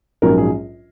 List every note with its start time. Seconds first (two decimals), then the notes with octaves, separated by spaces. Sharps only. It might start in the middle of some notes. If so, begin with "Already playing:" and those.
0.22 A#1 G#2 F#3 C#4 A#4
0.37 G#4